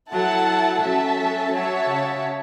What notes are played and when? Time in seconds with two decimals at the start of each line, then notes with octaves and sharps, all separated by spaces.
0.12 F#3 E4 A4 F#5 A5
0.82 F#3 C#4 A4 E5 A5
1.18 F#3
1.53 F#3 F#4 C#5 E5 A5
1.89 C#3